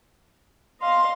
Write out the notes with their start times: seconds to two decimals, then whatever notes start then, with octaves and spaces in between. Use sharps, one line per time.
0.81 D#5 F5 C6